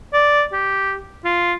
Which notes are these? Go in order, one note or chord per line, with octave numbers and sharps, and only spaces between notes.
D5
G4
F4